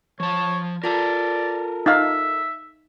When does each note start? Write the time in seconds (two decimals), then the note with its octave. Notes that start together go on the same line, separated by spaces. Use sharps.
0.20 F3 C#5 A5
0.84 F4 A4 A#4 D5 A5
1.86 D#4 E5 F5